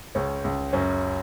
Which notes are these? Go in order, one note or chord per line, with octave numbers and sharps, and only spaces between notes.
C#2 C#4
C#2
F#2 C#4